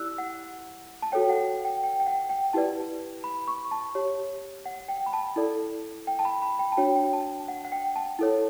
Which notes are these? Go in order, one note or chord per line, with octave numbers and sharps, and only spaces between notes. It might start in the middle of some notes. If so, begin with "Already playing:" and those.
Already playing: E4 G4 D5 E6 F#6
F#5
A5
F#4 A4 C#5 G5
F#5
G5
G5
G5
F#5
G5
E4 G4 B4 D5 A5
B5
C#6
A5
G4 C#5
F#5
G5
B5
A5
E4 A4 D5
G5
A5
B5
B5
G5
A5
D4 F#4 C#5 G5
G5
A5
F#5
F#5
G5
A5
E4 A4 C#5